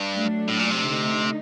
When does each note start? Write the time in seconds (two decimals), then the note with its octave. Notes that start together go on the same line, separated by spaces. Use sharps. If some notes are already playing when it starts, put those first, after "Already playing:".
Already playing: G2
0.12 F#3 A3 D4
0.48 A2
0.59 A#2
0.71 C3
0.83 D3 A3 D#4